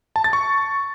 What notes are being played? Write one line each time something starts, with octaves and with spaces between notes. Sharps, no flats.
A5
A6
C#6